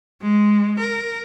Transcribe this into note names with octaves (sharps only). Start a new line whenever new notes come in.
G#3
A#4